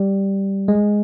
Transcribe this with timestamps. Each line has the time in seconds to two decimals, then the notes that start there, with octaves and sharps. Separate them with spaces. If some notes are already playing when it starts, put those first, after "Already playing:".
Already playing: G3
0.68 G#3